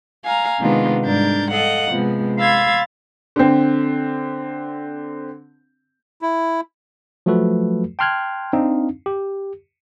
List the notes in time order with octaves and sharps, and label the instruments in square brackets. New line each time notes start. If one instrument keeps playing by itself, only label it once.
[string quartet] F5 G#5 A#5
C3 D#3 G#3 B3 D4 F4
G#2 G3 D4 A#4 G6 A6
A4 D#5 F5 F#5
C3 F3 G#3 B3
F5 B5 C6 E6 G#6 A6
[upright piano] D3 C4
[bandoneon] E4
[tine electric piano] F3 F#3 A3 F#4 A4 B4
G5 A5 C6 F6 F#6 G#6
C4 D4 D#4 F5
G4